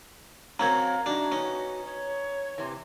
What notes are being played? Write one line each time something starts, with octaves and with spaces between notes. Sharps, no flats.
F#3 C4 C#4 F#4 A#4 F5 A#5 G#6
A3 D4 D#4 F#4
B3 C#4 D#4
C#5
C3 E3